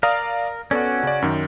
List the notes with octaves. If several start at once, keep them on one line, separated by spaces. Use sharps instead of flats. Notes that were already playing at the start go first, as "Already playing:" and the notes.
A#4 D5 F5 D#6
B3 C#4 F#4 A4 D5
C#3 D5
F#2 D#3